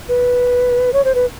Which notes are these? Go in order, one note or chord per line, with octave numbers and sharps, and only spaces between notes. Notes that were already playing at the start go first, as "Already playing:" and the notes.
B4
C#5
C5
B4